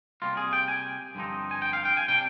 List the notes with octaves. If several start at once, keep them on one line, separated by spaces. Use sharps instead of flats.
C3 G3 A#3 F4
G#4
G5
G#5
G2 D3 F3 C4 D#4
G#5
G5
F5
G5
G#5
C3 G3 D4 G5